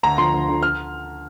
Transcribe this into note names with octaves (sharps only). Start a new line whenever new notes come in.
D2 A#5
D3 F3 C6
D2
D3 F3
F6